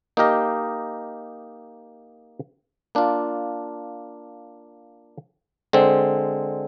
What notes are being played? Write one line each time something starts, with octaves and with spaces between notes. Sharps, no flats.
A#3 D#4 G4 A#4 D#5
A#3 D4 F4
D3 G#3 C4